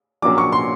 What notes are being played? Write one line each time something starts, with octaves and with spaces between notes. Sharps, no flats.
A#1 A#2 F#3 A#3 C#4 D6
C#6
C6